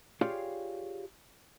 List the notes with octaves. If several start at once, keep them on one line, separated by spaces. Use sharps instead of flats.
F4 G4 G#4 C#5 D5 F5